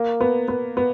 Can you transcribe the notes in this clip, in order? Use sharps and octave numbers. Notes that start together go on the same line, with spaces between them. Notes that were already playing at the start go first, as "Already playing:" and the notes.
Already playing: A#3
B3
B3
B3